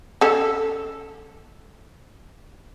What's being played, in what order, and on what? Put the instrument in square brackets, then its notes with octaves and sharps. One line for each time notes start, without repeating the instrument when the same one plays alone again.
[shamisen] C#4 A4